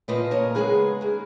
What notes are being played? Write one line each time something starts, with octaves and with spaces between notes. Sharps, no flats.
A#2 F3 A#3 B4 D#5
A#4 C#5
C#3 G#3 B3 G#4 B4
D#3 A#3